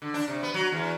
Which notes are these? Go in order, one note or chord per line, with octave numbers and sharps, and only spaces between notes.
D3
D4
C3
B3
F#3
E2